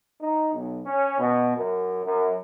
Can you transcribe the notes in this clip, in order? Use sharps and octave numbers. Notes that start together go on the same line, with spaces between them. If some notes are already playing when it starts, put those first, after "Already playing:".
D#4
B1
C#4
B2
F#2
F#2